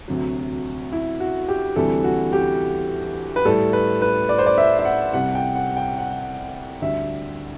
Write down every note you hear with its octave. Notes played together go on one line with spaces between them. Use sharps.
D2 C3 F#3
E4
F#4
G4
D2 C3 E3 G3 A4
F#4
G4
B4
A2 G3 A4
B4
B4
D5
C5
D5
E5
E5
F#5
C2 C3 G3 F#5
G5
F#5
G5
F#5
D2 D3 G3 E5